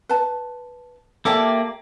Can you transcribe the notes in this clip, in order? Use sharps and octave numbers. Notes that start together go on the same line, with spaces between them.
B4 A5
A#3 E4 G4 A4 D5 A5